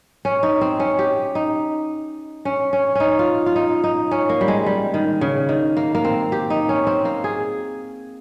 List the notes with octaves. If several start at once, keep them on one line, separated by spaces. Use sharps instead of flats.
C#4
D#4
C4
C#4
G4
D#4
C#4
C#4
C#4 D#4
F4
F4
D#4
D#4
C#4
A#3
G3
G#3
G3
D#3
C#3
D#3
A#3
A#3
C4
G4
D#4
C#4
C4
A#3
G#4